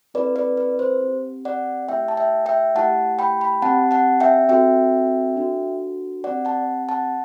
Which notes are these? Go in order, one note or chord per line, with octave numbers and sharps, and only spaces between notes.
C4 E4 A4 B4 D5
B4 D5
B4
C5
C4 G4
D5 F#5
A3 E4 G4 E5 G5
A5
E5 G5
E5 G5
A3 E4 G4 F#5 A5
G5 B5
G5 B5
C4 G4 F#5 A5
F#5 A5
E5 G5
C4 F#4 A4 E5 G5
D4 F#4 A4
C4 G4 D5 F#5
F#5 A5
F#5 A5